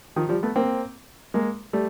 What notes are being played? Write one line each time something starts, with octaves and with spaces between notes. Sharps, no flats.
D#3 F3
F3 G3
A3 B3
A#3 C4
G#3 A#3
G3 A3